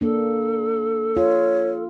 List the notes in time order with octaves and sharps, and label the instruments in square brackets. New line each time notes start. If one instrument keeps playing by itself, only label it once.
[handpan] A#3 D4 [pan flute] A4
[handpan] F4 [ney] C#5